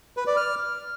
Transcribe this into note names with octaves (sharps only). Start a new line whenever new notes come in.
B4
D5
F6